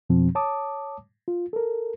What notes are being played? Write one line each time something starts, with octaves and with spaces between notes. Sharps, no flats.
F2 B2 F3 C4
C#5 A5 D6 D#6
F4
A4 A#4